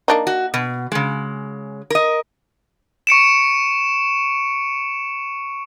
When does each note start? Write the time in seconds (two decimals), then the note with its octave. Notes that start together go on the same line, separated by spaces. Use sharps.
0.08 A#3 D4 D#4
0.27 F#4
0.54 B2
0.92 C#3 G#3
1.90 A#4 D#5
3.07 C#6 C#7 D7 E7